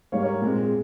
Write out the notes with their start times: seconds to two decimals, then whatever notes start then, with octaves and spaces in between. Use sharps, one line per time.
0.12 G#2 G3 A#3 C#5 F5
0.22 A#4 C#5
0.41 A#2 G#3 C4
0.63 G#4